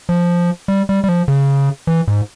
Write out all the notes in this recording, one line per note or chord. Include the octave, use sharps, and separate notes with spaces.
F3
G3
G3
G3
F3
C#3
E3
G#2